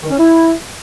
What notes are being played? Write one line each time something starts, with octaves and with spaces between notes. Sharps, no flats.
D#3
C#4
E4